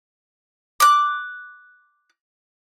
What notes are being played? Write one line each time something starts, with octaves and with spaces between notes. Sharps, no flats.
D6 F#6